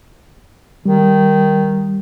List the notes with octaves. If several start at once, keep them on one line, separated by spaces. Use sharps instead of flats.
D#3 G3